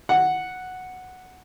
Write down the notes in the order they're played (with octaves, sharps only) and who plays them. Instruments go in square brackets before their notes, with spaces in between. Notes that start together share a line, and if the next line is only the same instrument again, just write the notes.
[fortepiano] F#5